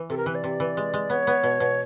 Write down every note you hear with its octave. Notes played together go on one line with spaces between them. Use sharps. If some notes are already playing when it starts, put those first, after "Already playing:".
Already playing: E3
C3 A4
A#4
E3 B4
D5
C3
E3
G#3
G#3
B3 C#5
B3
B2
B2